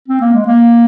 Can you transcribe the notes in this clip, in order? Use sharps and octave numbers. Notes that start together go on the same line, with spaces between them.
C4
A#3
G#3
A#3